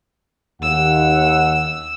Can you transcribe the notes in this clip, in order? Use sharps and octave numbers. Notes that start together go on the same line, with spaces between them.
D#2 F#5 E6